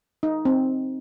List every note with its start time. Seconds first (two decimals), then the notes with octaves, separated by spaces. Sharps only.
0.23 D#4
0.45 C4